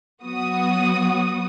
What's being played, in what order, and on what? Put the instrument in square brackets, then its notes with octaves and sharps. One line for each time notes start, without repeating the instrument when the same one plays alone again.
[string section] F#3 B3 F#4 D#6